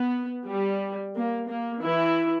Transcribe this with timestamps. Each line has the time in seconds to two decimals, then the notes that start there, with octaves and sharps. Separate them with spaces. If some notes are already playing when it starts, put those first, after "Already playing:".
Already playing: B3
0.46 G3
1.14 A#3
1.48 A#3
1.82 E3 E4